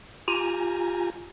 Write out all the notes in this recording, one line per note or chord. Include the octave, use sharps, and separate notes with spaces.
F4 G4 G#5 A#5